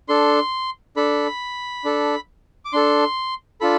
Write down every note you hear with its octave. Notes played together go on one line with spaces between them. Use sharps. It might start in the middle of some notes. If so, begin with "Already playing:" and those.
D4 A4 C6
D4 A4 B5
D4 A4
D6
D4 A4 C6
D4 F4 A4 B5